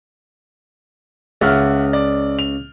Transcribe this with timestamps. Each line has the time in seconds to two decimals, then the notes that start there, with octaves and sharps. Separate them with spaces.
1.41 C#2 E5 F#5 F6
1.93 D5
2.39 F7